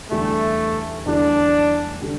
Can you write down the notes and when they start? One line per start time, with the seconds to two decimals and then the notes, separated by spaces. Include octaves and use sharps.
0.11 E2 D3 G3 A3 E4
1.06 E2 D3 G3 D4 E4
2.02 D3 G3